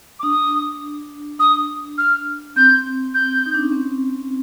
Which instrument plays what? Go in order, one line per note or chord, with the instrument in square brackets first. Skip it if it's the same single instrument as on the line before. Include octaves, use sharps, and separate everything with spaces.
[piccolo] D6
[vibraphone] D4 [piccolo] D#6
[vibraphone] D4 [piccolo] D#6
[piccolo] F6
[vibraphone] C4 [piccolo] G6
[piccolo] G6
[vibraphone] D#4
D4
C#4
C4